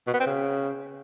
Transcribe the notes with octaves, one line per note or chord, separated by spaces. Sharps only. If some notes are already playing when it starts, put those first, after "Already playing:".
B2
B3
C4
C#3